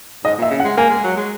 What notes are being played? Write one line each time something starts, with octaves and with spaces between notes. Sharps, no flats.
G#2 D#5
A#2 E5
C#3
F#5
G#3
A#3 G#5
G#3
F#3
G#3